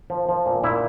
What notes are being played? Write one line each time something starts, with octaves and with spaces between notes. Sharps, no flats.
F3
F3
A#2
A#2 E4